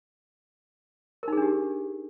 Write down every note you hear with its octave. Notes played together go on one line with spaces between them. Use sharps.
D4 D#4 G4 G#4 A#4